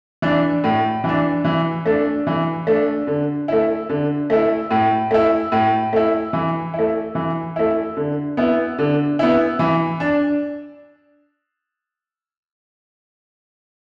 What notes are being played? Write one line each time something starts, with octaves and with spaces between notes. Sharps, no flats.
E3 D4
A2
E3 D4
E3
A3 D4
E3
A3 D4
D3
A3 E4
D3
A3 E4
A2
A3 E4
A2
A3 E4
E3
E4
A3
E3
A3 E4
D3
B3 E4
D3
B3 E4
E3
D4